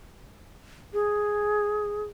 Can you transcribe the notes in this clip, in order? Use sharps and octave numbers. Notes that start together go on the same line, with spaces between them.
G#4